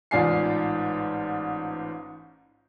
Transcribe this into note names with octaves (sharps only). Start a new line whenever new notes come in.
A1 G#2 F4 D5 G#5 C7